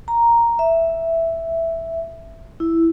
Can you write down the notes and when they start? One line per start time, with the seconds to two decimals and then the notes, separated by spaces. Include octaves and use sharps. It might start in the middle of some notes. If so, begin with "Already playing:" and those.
0.08 A#5
0.59 E5
2.60 E4